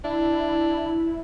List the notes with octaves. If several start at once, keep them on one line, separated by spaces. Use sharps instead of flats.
D4 E4